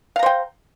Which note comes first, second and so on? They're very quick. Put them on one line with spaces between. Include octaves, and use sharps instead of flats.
F5 A#5 C5 G5